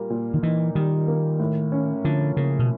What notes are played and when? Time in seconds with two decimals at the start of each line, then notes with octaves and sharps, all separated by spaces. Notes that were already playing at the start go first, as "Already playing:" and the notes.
Already playing: A#2 G3 A#3
0.10 A#2
0.34 D#3
0.43 E3 D#4
0.75 D#3 G3
1.08 A#3
1.40 A2
1.72 C#4
2.04 D3 F3
2.36 C#3 A#3
2.59 B2